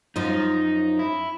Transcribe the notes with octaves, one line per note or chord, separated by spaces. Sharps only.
F#2 F3 D#4
E4